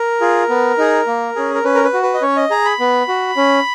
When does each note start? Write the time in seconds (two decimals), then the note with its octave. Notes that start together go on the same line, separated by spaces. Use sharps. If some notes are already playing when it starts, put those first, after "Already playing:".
Already playing: A#4
0.21 F4 G#4
0.49 B3
0.78 D#4 G#4
1.07 A#3
1.36 C#4 G#4
1.54 A#4
1.64 C#4 B4
1.75 A#4
1.84 B4
1.93 F#4
2.03 B4
2.14 D#5
2.22 C#4 C#5
2.36 D#5
2.50 G#4 A#5
2.65 B5
2.80 B3
3.08 F#4
3.37 C#4